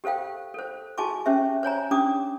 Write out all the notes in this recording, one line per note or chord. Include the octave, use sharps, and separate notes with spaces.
G4 A4 C5 F5 G5
A4 C5
F#4 G#4 G#5 A5 C#6 D6
C#4 G4 C5 E5
C5 C#5 G#5 A#5
C#4 D4 G4 D6 D#6